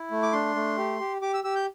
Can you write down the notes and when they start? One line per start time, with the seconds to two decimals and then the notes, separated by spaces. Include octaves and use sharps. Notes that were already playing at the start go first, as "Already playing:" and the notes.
Already playing: E4
0.11 A3
0.22 D6
0.32 D4 C6
0.56 A3
0.77 G4
1.00 G4
1.22 G4 D6
1.34 E6
1.44 G4 E6
1.56 G6